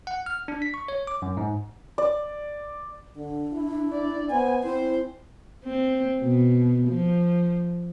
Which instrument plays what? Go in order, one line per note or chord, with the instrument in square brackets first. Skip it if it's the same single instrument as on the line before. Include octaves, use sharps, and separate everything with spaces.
[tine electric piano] F#5
F6
D4
B6
C#6
C#5
D6
F#2
G#2
[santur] D5
[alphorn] D3 [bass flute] D4
[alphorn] E4
[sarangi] D5
[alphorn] B3 [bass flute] C5 [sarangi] G#5
[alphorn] C4 [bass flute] E4 [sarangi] C5
[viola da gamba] C4
B2
F3